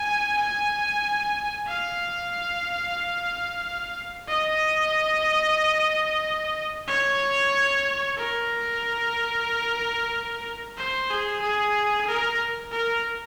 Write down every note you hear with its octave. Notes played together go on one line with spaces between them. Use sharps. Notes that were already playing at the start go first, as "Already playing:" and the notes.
Already playing: G#5
G#5
F5
D#5
C#5
A#4
C5
G#4
G#4
A#4
A#4